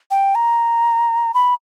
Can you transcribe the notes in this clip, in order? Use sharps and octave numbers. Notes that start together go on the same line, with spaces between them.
G5
A#5
B5